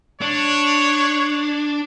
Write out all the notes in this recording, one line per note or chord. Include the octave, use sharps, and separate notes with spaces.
D4 C#5